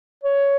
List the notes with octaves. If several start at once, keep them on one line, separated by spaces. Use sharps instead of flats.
C#5